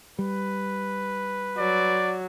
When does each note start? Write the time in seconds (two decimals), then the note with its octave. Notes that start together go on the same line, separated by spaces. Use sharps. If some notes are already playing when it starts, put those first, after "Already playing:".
0.19 G3 B4
1.58 F#3 D5